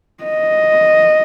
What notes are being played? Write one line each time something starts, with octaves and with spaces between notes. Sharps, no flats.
D#5